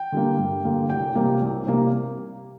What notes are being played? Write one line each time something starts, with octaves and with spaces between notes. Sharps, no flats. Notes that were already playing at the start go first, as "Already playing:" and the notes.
Already playing: G5
D3 G3 A#3
G2
D3 G3 A#3
C2 G5
C3 G3 A#3
C2
C3 G3 A#3